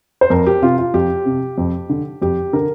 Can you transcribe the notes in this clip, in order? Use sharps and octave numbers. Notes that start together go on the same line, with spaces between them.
C5
F2 A#4
G4
C3 F4
F4
F2 G4
C3
F2
D3
F2 G4
D3 A#4